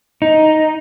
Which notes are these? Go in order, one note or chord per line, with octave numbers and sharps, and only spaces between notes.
D#4